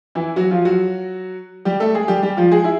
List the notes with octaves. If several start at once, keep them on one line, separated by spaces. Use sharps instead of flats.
E3 E4
F#3 F#4
F3 F4
F#3 F#4
G3 G4
A3 A4
G#3 G#4
G3 G4
G3 G4
F3 F4
G#3 G#4
E4